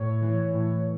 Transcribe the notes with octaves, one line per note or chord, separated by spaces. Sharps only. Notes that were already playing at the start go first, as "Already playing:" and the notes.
Already playing: A2 C#5
E3
A2